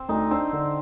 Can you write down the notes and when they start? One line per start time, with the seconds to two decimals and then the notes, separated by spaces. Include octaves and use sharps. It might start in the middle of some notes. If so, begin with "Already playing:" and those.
Already playing: C4
0.09 D2 D#4
0.31 C4 D4
0.53 D3